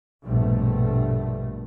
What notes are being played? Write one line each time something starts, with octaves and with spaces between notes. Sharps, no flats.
A#1 G2 B2 A3